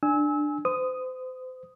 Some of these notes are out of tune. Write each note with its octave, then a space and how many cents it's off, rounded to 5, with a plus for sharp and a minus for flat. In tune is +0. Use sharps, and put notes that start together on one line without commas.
D4 +15 G#5 +0 E6 -25
C5 -35 D#6 +0